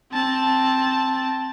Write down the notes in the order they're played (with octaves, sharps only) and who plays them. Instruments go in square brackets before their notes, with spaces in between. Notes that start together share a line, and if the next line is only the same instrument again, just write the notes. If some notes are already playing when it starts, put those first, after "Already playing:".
[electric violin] C4 A5